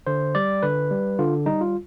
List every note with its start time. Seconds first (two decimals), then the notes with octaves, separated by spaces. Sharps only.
0.07 D3 C5
0.35 G3 D5
0.63 D3 B4
0.91 G3
1.19 D3 F4
1.46 G3 D#4
1.61 F4